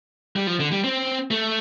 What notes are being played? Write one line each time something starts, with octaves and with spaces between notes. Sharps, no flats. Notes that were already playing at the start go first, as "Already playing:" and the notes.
G3
F3
D3
G3
C4
A3